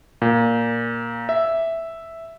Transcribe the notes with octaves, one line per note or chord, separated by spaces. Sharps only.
A#2
E5